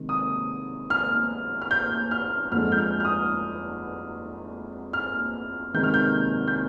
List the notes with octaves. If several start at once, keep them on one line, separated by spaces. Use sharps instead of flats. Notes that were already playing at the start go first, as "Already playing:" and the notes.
Already playing: C3 D#3 G#3
D#6
F6
F6
G6
F6
F2 D3 G#3 F6
G6
F6
F6
D#6
F6
C3 D#3 G#3 G6
F6
G6
G6